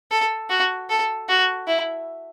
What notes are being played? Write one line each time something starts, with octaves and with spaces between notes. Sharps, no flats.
A4
F#4
A4
F#4
E4